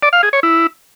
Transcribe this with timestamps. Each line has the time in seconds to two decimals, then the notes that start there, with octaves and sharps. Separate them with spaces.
0.03 D5
0.13 F5
0.23 G#4
0.33 C#5
0.43 E4